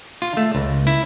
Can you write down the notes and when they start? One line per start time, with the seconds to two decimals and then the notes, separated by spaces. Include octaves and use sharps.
0.22 F4
0.37 A3
0.55 C#2
0.87 E4